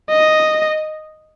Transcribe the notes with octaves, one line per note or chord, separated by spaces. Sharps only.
D#5